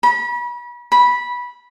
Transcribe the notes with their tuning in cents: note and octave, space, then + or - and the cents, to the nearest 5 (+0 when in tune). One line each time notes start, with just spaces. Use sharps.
B5 -35
B5 -15